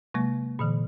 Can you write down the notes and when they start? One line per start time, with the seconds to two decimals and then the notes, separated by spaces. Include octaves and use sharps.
0.14 C3 F#3 G#3 A#3
0.59 A#2 D3 E3